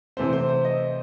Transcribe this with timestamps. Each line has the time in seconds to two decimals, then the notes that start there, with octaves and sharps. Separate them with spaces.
0.17 C3 E3 A3 C4 C5
0.33 C5
0.49 C5
0.65 D#5